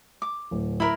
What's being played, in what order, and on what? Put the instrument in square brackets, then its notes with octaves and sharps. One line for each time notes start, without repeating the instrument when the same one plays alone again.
[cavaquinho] D6
[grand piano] D1
[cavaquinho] E4 A#4 B5